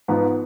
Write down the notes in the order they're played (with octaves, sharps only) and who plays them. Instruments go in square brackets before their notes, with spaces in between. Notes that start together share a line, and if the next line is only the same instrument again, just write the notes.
[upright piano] G#2 F3 B3